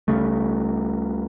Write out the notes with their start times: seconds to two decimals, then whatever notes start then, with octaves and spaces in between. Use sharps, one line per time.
0.08 C#2 C#3 G3 A3